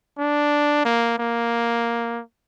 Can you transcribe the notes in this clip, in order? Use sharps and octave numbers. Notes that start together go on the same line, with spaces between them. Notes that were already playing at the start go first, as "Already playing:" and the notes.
D4
A#3
A#3